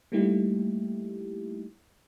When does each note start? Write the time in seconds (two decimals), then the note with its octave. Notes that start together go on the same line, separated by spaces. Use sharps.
0.12 G3 A3 A#3 D#4 E4 G4